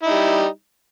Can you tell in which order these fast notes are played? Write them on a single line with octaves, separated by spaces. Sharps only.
E4 D#4 G3